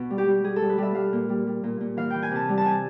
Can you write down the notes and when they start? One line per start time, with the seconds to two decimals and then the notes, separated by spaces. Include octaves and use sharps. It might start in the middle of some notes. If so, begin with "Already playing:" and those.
Already playing: B2
0.10 G3
0.18 G4
0.27 G3
0.44 G3 G#4
0.56 G3 A4
0.70 B4
0.78 G3 E5
0.95 G3 F5
1.12 A#2
1.29 G3
1.47 G3
1.64 A#2
1.81 A#2
1.97 E3 F5
2.10 E3 G5
2.23 G#5
2.31 C3 A5
2.49 G3
2.58 A5
2.65 C3 G#5